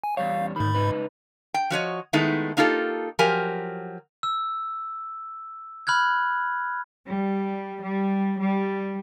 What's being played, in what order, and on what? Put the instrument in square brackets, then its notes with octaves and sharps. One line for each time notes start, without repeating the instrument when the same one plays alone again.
[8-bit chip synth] G#5
[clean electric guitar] E2 G3 C#5 [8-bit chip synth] F5
[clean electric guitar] D2 D#3 [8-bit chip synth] G#2 B5
[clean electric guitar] C#2 D#4 B4
[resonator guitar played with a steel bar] G5
F3 F#4 C#5 D#5
D#3 G#3 A3 B3 D#4 E4
A#3 D#4 F4 G4 A4
F3 F#3 G4 A#4 G#5
[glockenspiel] E6
B5 F6 F#6 G#6
[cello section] G3
G3
G3